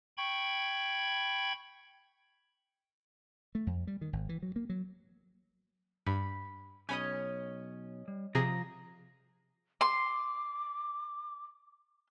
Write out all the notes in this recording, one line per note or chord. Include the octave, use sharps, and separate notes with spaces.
G5 B5 C#6 G#6
A3
F2
G3
D#3
G#1
E3
F#3
A#3
F#3
G2 B5
B1 C#4 C#5 D#5 G#5 B5 D#6
G3
C3 F3 G#4 A#5
C6 D6